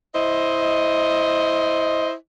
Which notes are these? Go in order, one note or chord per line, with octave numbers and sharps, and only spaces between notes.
E4 C5 D#5